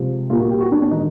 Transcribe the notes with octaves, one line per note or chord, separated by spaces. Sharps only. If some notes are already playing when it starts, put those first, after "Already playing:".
Already playing: C3 F3 G#3
A#2 G3 A#3 F4
F#4
G4
F#4
D4
D4
D#3 G#3 D#4